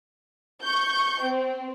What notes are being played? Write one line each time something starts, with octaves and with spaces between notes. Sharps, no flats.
C#6 G6
C4